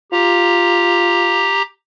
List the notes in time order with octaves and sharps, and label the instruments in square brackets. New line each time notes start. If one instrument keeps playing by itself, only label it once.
[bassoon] F4 [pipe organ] G4 A#5